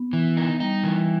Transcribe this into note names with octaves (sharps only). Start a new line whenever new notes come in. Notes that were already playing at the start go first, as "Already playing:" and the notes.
Already playing: B3
E3
D#4
G3 D#4
E3